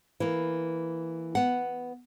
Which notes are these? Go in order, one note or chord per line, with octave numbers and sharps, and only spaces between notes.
E3 A#3
B3 F#5